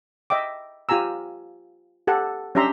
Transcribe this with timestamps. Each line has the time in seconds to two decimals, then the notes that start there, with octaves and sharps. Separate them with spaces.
0.30 D#5 E5 G5 D6
0.89 F4 G4 G#5 A#5 E6
2.07 G4 A4 F#5
2.55 C#4 D4 G4 E5 A#5 C6